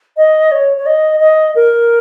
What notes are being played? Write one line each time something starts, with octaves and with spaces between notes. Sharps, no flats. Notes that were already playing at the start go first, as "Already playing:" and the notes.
D#5
C#5
C#5
D#5
D#5
A#4